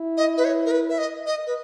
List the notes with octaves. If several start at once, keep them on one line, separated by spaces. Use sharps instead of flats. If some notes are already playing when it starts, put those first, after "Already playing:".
Already playing: E4
D#5
B4
C#5
A#4
B4
E5
D#5
D#5
B4